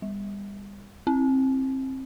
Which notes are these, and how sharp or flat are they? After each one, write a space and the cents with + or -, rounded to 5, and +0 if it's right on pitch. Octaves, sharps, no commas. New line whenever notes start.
G3 +35
C4 +25